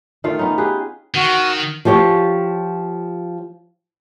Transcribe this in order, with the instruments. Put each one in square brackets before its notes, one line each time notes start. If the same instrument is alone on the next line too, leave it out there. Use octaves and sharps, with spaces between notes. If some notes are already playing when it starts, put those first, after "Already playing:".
[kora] D#3 A3 F4 F5
B3 C#4 D#4
G4 G#4 B4
[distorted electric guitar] D#3 [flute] F#4
[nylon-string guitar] F3 F4 G4 C#5